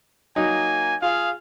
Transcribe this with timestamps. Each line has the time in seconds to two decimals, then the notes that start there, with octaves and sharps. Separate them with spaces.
0.36 F#3 A#3 D#4 G#5
1.02 F4 G#4 F5